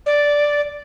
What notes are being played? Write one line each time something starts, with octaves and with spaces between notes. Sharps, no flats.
D5